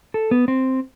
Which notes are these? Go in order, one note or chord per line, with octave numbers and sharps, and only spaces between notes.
A4
B3
C4